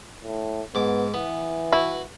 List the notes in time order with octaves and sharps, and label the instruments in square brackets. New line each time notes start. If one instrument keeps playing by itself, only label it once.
[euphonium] A2
[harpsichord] G#2 D6 [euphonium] B3
[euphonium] E3 [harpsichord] B3
[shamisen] E4 [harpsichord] F#4 B4